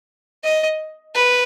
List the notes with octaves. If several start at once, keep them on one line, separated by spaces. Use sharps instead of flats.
D#5
B4